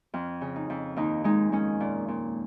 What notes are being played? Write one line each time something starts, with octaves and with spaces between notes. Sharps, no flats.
F2 F4
C#3
D#4
F2
D#2 D#4
G#3 D#4
G#3 C#4
A#2
A#2